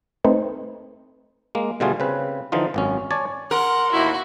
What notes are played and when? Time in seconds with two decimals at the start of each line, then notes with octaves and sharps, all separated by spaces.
0.24 A3 C4 D#4 A4 B4 C5
1.55 G#3 A#3
1.80 B2 D3 G3 A3 F4 G#4
2.00 C#3 C4 B4
2.52 D3 E3 F3 D#4 F4
2.74 G#1 F#2 C#4
3.11 C#5 D5 G#5 A5
3.51 A#4 F#5 C6
3.92 A1 D#2 E4 F#4